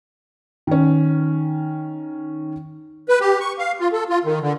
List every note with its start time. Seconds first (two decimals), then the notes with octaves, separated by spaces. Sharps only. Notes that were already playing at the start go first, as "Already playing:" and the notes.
0.67 D#3 C#4
3.09 B4
3.21 G4
3.40 C#6
3.58 F5
3.80 F4
3.92 A4
4.09 F4
4.25 D#3
4.42 D3